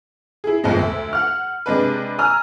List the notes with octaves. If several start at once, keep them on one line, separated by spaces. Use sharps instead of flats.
E4 G#4
C2 F2 B2 F3 G#3
D2 E5
F#5 F6
C3 G#3 D4 B4
G#5 A#5 E6 F6